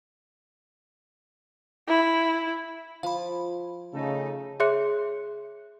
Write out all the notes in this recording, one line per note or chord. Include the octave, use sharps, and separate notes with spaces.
E4
F3 F5 B5
C#3 A3 D#4 A4
G#4 C#5 E5 C6 F#6 C#7